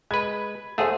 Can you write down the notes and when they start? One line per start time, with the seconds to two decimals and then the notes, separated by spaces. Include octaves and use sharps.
0.11 G#3 B4 B5 G#6
0.78 A3 G#4 C5 E5 F#5